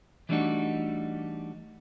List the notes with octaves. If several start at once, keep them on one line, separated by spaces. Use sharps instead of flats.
E3 G3 A3 D4 D#4 F#4